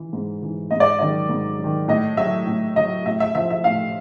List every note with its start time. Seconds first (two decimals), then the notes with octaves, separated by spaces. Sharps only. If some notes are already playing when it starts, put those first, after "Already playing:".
Already playing: E3
0.13 G#2
0.42 E3
0.71 G#2 D#5
0.80 D5
0.99 D#3 F#3 D5
1.29 G#2
1.59 F#3
1.64 D#3
1.88 A2 D#5
2.17 F#3 E5
2.47 A2
2.76 F#3 D#5
3.06 A2 E5
3.20 E5
3.35 F3 E5
3.50 E5
3.64 A2 F5